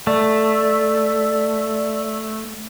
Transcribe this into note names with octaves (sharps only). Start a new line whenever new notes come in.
A3 D5